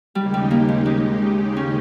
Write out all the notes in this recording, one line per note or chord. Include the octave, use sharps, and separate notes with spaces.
D#2 C#3 G3 G#3 D#4 G4
G3
A#3
G#3
G#3
C#4